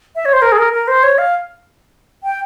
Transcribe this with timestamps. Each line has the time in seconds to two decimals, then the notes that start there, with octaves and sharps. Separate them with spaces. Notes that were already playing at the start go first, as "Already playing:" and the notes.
0.15 E5
0.25 C#5
0.33 C5
0.42 A#4
0.52 G#4
0.58 A#4
0.73 A#4
0.88 C5
1.03 C#5
1.18 F5
2.24 G5